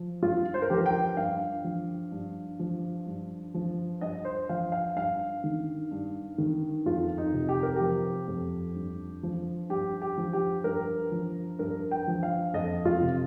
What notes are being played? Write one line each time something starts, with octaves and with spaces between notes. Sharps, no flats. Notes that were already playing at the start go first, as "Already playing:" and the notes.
Already playing: F3
G2 F4
C5
A#4
F3 G4
A#4
G5
G2 F5
F3
G2
F3
G2
F3
G2 D#5
C5
F3 F5
F5
G2 F5
D#3
G2
D#3
F2 F4
D#4
C3
G4
A#4
F3 G4
F2
G2
F3
G2 G4
G4
F3
G4
G2 A#4
F3
G2 A#4
G5
F3
F5
F2 D#5
F4
C3